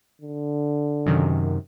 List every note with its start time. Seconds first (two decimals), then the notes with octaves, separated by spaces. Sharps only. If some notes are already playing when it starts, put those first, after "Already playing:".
0.21 D3
1.06 F#2 C3 D#3